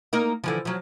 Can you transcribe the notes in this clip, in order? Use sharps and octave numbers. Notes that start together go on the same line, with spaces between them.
A#3 D#4 A#4
D3 E3 F3
F3 F#3